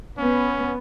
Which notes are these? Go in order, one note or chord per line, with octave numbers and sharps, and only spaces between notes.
B3 C#4